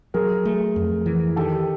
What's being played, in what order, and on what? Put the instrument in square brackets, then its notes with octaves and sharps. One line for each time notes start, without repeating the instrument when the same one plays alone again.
[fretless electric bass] F#3 [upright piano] G#4 A#4
[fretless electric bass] A3
F2
E3
[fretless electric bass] D#3 [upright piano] G4 A4